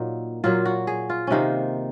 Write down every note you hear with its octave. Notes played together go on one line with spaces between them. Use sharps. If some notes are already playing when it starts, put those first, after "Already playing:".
Already playing: A#2 F#3 A#3 D#4
A#2 F#3 A#3 F4
F#4
G#4
F4
C3 D#3 A#3 C#4 D#4